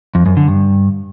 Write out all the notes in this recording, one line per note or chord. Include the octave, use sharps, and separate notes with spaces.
F2
F#2
D3
G2